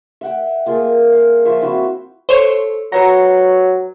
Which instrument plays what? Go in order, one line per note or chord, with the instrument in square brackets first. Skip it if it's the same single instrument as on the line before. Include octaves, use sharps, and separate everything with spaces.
[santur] E5 F#5 G5
A#3 F4 G#4
F5
F3 E5 C6 C#6
C4 E4 F#4 C5
[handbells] A4 [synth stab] C5 C#5
[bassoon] F#3 [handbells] F#4 B4 F#5 [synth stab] A#5